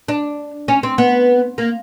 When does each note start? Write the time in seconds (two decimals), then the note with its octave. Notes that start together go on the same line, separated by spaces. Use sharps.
0.08 D4
0.68 C#4
0.83 C4
0.98 B3
1.58 A#3